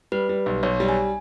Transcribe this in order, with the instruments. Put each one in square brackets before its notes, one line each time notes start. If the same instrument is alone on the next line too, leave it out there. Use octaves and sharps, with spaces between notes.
[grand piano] G3 [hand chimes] B4
[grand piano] G3
B1
[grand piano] B1 [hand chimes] C#5
[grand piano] G3
[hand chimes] G#5